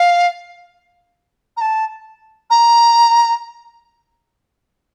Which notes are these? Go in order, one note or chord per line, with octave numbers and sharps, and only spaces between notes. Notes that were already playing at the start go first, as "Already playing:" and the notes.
Already playing: F5
A#5
A5
A#5